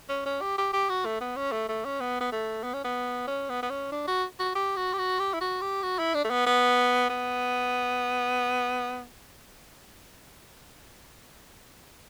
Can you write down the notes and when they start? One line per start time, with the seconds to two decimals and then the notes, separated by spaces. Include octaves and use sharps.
0.09 C#4
0.26 C#4
0.41 G4
0.58 G4
0.73 G4
0.89 F#4
1.05 A3
1.21 B3
1.37 C#4
1.52 A3
1.68 A3
1.85 C#4
2.01 B3
2.21 B3
2.32 A3
2.64 B3
2.74 C#4
2.84 B3
3.27 C#4
3.50 B3
3.63 B3
3.70 C#4
3.92 D4
4.08 F#4
4.39 F#4
4.55 G4
4.77 F#4
4.93 G4
4.98 F#4
5.19 G4
5.34 E4
5.41 F#4
5.61 G4
5.83 F#4
5.99 E4
6.14 D4
6.24 A3
6.30 B3
6.47 B3
7.10 B3